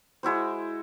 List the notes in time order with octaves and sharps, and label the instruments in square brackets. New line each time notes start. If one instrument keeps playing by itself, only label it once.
[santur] G#3 E4 F#4 C5